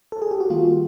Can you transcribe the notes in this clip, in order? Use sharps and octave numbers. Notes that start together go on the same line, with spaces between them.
A4
G#4
G4
F#4
D#3 G3 A#3 F4